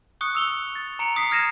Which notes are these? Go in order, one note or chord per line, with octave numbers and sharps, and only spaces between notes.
C#6 D#6 F#6 C#7
E6 F7 G7
A6
A#5 C#7 D7 F7
D#6 B6 C7
D#6 F6 G#6 A#6 D#7 E7